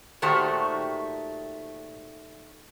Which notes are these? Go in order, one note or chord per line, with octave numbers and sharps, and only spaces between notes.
A#2 D#3 A3 F#4 G4 C5